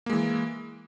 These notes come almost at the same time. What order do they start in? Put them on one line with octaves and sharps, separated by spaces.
A#3 G#3 E3